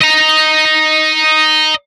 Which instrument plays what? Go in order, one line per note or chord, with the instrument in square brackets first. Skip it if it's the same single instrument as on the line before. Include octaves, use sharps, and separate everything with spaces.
[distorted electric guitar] D#5 A#5